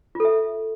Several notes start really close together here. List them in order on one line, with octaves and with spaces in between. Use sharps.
F4 A4 E5